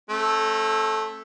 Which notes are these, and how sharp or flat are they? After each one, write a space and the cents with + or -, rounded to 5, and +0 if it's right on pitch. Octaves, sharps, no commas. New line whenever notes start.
A3 -5 C4 +45